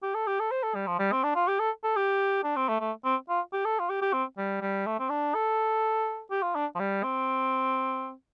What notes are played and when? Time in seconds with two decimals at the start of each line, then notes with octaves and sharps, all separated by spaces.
0.03 G4
0.14 A4
0.27 G4
0.40 A4
0.51 C5
0.63 A4
0.75 G3
0.87 F3
0.99 G3
1.12 C4
1.24 D4
1.35 F4
1.48 G4
1.59 A4
1.84 A4
1.97 G4
2.44 D4
2.56 C4
2.69 A3
2.81 A3
3.05 C4
3.29 F4
3.53 G4
3.65 A4
3.79 F4
3.89 G4
4.02 G4
4.13 C4
4.38 G3
4.61 G3
4.86 A3
4.99 C4
5.10 D4
5.34 A4
6.31 G4
6.42 F4
6.55 D4
6.75 F3
6.80 G3
7.03 C4